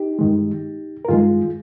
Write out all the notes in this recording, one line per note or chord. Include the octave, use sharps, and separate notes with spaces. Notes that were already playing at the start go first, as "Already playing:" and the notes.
Already playing: D#4 G4
G2 D#3 G#3
A#4
G2 D#3 G#3 F4 G#4